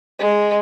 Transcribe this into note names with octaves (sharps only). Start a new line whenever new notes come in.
G#3